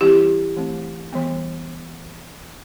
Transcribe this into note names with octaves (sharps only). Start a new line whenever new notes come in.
E3 G3 C4 E4 G4
E3 A3 C4
E3 G3 B3